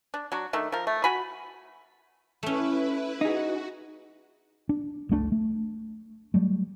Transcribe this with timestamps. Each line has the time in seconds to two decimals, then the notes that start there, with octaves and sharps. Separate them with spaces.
0.14 D4
0.32 F#3 D4 F#4
0.53 D#3 A3 D4
0.72 F3 A#4
0.87 A3
1.04 F#4 G#5 B5
2.43 A3 C#4 E4 B4
3.21 D#4 F#4 G#4
4.69 D4
5.09 G1 C#2 A3 D4
5.32 A3
6.34 F#3 G3 A3